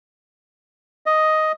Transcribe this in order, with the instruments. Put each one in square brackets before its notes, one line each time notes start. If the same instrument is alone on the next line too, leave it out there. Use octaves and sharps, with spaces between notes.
[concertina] D#5